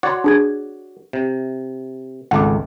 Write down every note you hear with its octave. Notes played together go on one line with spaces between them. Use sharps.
F#4 C#5 D5 F#5 C6
D4 G#4 G#6
C3
G#1 C#2 A3 F#5 D6